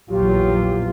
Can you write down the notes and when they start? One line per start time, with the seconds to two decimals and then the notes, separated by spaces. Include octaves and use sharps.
0.10 A#1 E2 F#3 F4 G4